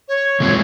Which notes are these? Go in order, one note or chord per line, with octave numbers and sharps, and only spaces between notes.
C#5
C#3 G#3 C4 F4